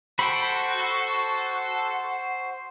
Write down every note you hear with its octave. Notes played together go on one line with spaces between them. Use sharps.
F#4 A4 C5 G5 B5